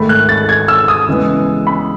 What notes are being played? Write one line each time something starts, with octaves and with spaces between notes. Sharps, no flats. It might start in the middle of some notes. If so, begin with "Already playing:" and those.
Already playing: G#2 D#3 A3 B5
F#6
A6
G#6
E6
D#6
C#3 E3 G#3 B3
B5